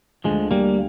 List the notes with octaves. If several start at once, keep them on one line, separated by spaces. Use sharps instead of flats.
D2 D3 F3 G#3
G3 A#3